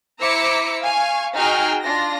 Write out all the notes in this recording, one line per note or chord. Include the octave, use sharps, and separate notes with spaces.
E4 C5 A#5 D6 E6 C#7
F5 G#5 C#6
D#4 F#4 G#4 G5 F6
D4 F4 A#6